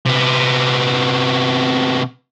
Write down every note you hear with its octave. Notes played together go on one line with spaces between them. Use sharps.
C3 B3